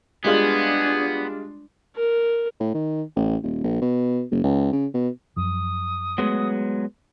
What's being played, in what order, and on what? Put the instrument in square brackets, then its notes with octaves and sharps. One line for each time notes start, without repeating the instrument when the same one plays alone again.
[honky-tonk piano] G3 G#3 F4 [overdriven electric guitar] B3 [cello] D4 [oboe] G#4
[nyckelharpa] A#4
[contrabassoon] A2
D#3
A1
D#1
A#1
B2
F#1
C#2
C#3
B2
[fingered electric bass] F#2 F3 [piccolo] D#6
[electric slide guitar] F#3 G#3 B3 [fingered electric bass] A3